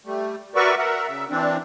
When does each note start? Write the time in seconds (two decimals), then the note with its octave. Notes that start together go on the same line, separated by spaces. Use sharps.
0.06 G3 A3
0.55 F#4 A#4 B4 D5 E5 C#6
0.78 A#4 E5 F#5
1.07 C#3 E5
1.30 E3 C4 D4